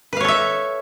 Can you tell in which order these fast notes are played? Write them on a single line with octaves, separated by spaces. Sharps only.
B4 F5 C#5 A4 E5